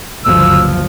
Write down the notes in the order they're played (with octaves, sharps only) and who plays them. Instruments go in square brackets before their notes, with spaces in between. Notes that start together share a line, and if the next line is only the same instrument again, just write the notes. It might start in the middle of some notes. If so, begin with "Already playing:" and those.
[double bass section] F#1 D2 G2 [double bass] F3 [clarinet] E6